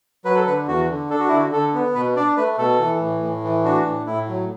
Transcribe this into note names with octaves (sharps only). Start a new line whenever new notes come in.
F#3 B4
A4
D3 B4
E2 F#4
D3
D4 A4
F#4
D3 E4
F#4
D3 A4
B3
B2 B4
D4 D5
A3 B4
B2 A4
E3
A2
A2
E3
D4 F#4
A2
A2 E4
F#3